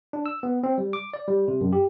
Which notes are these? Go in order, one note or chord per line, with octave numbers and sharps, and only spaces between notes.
D4
E6
B3
C4
G3
D6
D5
G3
C3
F#2
G4